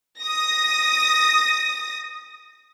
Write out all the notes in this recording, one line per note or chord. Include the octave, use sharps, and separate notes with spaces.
D#6 A#6